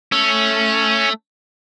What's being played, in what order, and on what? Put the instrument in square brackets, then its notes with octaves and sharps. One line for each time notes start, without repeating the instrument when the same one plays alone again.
[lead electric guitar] A3 [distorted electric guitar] C#4